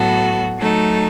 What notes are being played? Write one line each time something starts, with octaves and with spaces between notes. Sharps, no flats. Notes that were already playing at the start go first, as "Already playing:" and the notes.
Already playing: A2 F#3 B3 F#4 A4
F#3 A3 D#4 A4